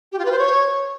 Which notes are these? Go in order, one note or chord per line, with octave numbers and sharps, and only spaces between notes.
G4
F4
B4
C5
C#5